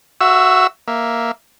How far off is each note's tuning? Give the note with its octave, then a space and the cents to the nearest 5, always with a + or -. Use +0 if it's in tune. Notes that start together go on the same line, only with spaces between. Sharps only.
F#4 +0 E5 +25 E6 +0
A#3 +0 E5 +0